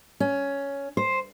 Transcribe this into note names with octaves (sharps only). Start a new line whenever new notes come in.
C#4
C5